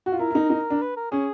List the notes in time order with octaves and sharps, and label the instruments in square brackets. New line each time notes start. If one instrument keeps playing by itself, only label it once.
[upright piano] F#4
F4
[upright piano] E4 [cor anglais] A#4
[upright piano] E4
D#4
D#4
D4
[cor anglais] B4
A#4
[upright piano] C#4 [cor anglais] G#4